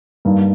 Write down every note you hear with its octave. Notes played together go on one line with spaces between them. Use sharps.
G2 G3 A#3 D#4